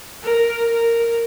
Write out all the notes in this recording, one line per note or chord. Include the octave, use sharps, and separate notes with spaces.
A#4
A#4